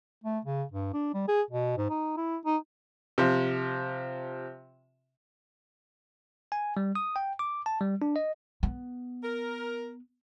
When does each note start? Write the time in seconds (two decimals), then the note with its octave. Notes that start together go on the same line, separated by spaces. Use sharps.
0.24 A3
0.45 C#3
0.72 G2
0.94 D4
1.14 G3
1.28 G#4
1.51 B2
1.78 G#2
1.90 D#4
2.17 E4
2.46 D#4
3.18 C3 F3
6.52 G#5
6.77 G3
6.95 D#6
7.16 G5
7.39 D6
7.66 A5
7.81 G3
8.02 D4
8.16 D#5
8.63 B3
9.23 A#4